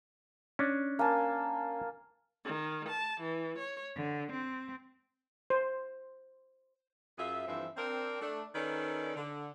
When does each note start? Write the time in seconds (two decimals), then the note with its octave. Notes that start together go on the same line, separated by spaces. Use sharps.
0.59 C#4 D4
0.99 A#3 G#5 A5
2.45 D#3
2.89 A5
3.22 E3
3.59 C#5
3.95 D3
4.31 C4
5.50 C5
7.18 F#2 F4 G#4 E5
7.47 G2 E3 F3 C4 A4 E5
7.77 C4 D4 A#4
8.22 A3 D4
8.54 D#3 C#4 D#4 A4 B4 D5
9.16 D3